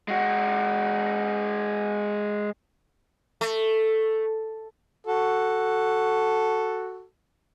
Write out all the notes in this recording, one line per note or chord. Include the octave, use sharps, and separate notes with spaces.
G#3 F#4
A3
F#4 A4